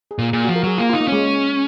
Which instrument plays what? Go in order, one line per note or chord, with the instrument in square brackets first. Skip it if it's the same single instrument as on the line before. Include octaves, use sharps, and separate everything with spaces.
[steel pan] G#4
[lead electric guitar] A#2 [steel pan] A#4
[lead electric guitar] A#2 [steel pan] G#4
[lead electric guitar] F3 [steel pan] F#4
[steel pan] A#4
[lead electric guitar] F#3 [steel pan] G#4
[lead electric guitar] A#3 [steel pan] F4
[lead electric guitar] D#4 [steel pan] F4
[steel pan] A#3
[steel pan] G#3 [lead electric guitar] C#4